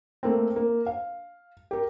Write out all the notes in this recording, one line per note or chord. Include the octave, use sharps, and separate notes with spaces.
A3 A#3 C4
A#3
F5
G4 A#4